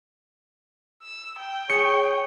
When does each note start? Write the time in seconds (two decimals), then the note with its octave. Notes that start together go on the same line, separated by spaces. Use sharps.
1.03 E6
1.39 G5
1.70 G#4 C#5 C#7